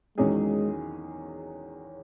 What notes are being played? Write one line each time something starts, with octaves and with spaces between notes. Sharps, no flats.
E2 D#3 F#3 G#3 C#4 G#4